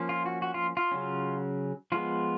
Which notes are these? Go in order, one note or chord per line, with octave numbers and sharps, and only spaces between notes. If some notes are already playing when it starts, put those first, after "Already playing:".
Already playing: F3 A#3 C#4
F4
F#4
F#4
F4
F4
C#3 F#3 C#4
F3 G#3 B3 F4